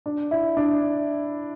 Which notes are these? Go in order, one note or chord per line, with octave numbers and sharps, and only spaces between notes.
D4
E4
D4